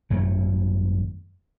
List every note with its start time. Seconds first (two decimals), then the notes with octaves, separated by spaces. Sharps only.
0.10 G#1 F#2 A3